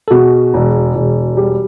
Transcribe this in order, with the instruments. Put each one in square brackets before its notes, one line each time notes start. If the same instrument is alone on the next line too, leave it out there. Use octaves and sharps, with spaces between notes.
[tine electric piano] A4
[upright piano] B2 [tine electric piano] F#4 G#4
[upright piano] E1
E1
G3